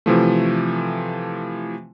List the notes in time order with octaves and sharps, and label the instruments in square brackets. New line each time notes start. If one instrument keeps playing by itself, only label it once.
[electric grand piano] C3 E3 F3 A3